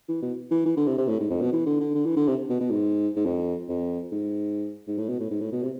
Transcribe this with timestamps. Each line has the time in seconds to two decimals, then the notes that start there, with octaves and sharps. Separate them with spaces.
0.08 E3
0.22 B2
0.51 E3
0.65 E3
0.77 D3
0.87 C3
0.98 C3
1.08 A2
1.20 G#2
1.30 F2
1.41 B2
1.52 E3
1.66 D3
1.80 D3
1.95 D3
2.06 E3
2.16 D3
2.28 C3
2.49 B2
2.60 B2
2.70 G#2
3.16 G#2
3.26 F2
3.69 F2
4.12 G#2
4.87 G#2
4.98 A2
5.09 B2
5.20 A2
5.31 G#2
5.41 A2
5.52 B2
5.63 C3